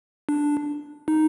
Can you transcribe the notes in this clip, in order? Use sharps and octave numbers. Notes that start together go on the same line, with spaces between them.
D4
D#4